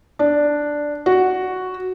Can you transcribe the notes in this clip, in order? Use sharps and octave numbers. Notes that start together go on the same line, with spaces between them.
D4
F#4